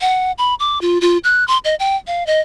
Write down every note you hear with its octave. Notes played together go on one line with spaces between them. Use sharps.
F#5
B5
D6
F4
F4
F#6
C6
D#5
G5
F5
D#5